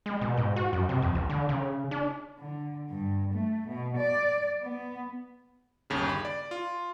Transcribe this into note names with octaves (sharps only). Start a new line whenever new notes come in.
G#3
B2
G#2
F#4
F#2
C3
F2
C#2
D3
C#3
D4
D3
G2
A3
B2
D5
B3
G1 D#2 C#3
B5
D5
F4